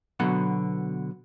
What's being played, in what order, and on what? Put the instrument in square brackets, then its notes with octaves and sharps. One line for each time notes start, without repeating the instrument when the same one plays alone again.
[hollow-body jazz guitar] B2 D3 F#3 B3 F#5